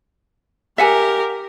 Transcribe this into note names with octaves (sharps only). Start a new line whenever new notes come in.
G4 A#4 E5 F#5 G#5